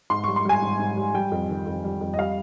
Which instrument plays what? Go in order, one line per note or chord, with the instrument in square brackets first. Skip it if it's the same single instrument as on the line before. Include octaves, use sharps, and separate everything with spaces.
[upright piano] G#2 C6
G3 C#6
C6
G3 G#5
G#2
G#2
G3
G3 G5
F2
D#3
F2
G3
F2
D#5
G3 F5